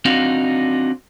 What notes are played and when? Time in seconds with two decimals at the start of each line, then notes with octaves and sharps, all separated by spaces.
0.05 C4 D4 D#4 F#4 F5